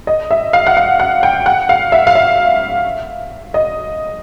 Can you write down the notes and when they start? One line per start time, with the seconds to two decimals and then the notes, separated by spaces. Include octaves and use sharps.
0.07 D#5
0.31 E5
0.53 F5
0.67 F#5
0.77 F5
1.00 F#5
1.23 G5
1.46 F#5
1.69 F5
1.92 E5
2.07 F5
2.15 E5
3.54 D#5